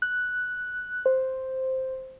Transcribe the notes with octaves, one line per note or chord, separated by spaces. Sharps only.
F#6
C5